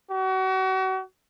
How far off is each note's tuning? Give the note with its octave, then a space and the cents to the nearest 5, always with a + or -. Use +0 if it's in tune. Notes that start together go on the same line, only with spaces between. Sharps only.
F#4 +35